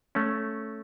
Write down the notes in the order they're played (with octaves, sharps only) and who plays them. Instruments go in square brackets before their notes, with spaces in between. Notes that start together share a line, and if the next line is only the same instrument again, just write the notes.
[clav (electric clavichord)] A3 C#4